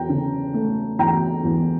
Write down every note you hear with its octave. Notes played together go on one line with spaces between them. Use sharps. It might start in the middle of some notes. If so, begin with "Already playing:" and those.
Already playing: E2 G5 A#5
C#3
A3
E2 G5 A#5
E2